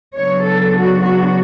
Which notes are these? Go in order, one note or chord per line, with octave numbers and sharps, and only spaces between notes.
C#3 F#3 B3 D4 C#5
A4
F#4
F#4